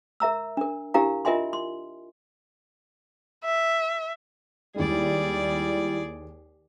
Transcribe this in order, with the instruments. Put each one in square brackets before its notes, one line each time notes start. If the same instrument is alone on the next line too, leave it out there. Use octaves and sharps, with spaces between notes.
[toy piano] A#4 E5 A#5 E6
D4 A#4
D4 E4 G4 A#4 F5 A#5
F4 A#4 D#5 E5 G#5 C6
C6
[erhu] E5
[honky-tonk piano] D#2 G#3 [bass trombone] G3 [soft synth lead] E4 [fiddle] G#4 D5